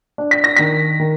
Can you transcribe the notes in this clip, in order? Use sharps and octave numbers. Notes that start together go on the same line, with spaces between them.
D4
B6
A#6
D#3 B6
D#3